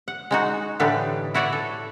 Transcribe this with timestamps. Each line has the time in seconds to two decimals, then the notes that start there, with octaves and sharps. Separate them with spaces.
0.08 F#5
0.31 G#3 D#4 F#4
0.80 A2 D3 E3 G3 D#4 B4
1.34 E4 F#4 C#5 D5 E5
1.53 A4